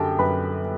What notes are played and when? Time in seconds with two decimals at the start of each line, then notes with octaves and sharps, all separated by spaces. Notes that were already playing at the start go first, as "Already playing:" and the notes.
Already playing: F#2 D3 G4 A4 G5 A5
0.19 F#2 B4 B5